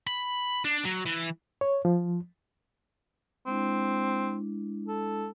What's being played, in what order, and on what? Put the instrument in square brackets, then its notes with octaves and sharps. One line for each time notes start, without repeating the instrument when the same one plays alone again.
[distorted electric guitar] B5
D4
F#3
E3
[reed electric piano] C#5
F3
[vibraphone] G#3 D4 E4 [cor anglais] C4
[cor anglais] A4